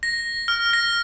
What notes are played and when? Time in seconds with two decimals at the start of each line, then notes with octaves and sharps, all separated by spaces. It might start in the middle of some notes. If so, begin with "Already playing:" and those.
0.03 A#6
0.48 F6
0.73 A#6